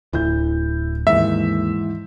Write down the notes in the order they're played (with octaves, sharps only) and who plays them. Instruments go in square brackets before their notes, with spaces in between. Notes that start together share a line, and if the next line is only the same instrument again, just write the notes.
[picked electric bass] D1 D2 [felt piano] E4 G6
[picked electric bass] D#2 [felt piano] G#2 E3 [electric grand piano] E5